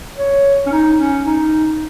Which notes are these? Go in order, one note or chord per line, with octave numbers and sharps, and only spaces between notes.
C#5
C#4
D#4
C#4
D#4